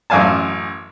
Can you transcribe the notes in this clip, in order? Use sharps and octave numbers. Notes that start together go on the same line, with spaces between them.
A1 F#2 F5 G#5 A5